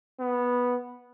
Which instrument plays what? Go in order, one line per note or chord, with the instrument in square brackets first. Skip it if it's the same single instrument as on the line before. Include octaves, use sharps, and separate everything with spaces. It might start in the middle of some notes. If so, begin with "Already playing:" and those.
[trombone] B3